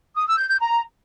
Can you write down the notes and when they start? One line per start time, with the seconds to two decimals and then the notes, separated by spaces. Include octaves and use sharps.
0.16 D#6
0.27 E6
0.38 G6
0.49 G6
0.60 A#5